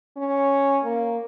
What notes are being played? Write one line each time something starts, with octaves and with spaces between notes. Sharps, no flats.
C#4
A#3